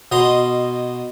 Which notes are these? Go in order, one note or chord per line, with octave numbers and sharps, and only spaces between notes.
B2 D#5 A#5 C6